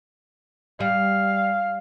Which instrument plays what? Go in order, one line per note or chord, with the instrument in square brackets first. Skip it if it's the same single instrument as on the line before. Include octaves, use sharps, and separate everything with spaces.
[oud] G3 [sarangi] F5